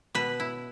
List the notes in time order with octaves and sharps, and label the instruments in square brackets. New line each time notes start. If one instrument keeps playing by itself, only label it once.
[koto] B2 B4
E4